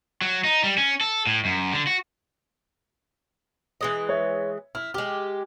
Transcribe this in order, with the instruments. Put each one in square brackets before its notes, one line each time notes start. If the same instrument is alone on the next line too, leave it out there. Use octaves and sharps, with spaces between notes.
[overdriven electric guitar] F#3
D#4
G3
C#4
A4
A2
F#2
D3
F#4
[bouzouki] E3 G#3 D#5
[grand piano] C#5 E5
[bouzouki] E4 [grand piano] F6
[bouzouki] G#3 G4 [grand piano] F6